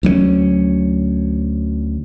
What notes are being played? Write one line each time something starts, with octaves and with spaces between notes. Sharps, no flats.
D2 F#3 A#3 C#4